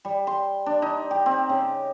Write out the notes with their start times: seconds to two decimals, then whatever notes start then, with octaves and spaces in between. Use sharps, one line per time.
0.05 G3
0.27 C6
0.66 D4
0.82 D#4
1.11 G4
1.26 C4
1.49 C#3